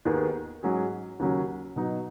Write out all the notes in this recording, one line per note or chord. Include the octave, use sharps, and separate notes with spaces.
D#2 D#3 B3 G#4
G#2 F#3 C#4 G#4
D#2 C#3 F#3 C#4
B2 F#3 D#4